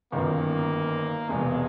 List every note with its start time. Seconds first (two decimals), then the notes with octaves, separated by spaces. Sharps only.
0.12 G1 F#2 D#3 A#3
1.29 E1 E2 C3 G#3